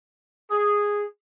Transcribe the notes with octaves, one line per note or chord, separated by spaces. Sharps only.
G#4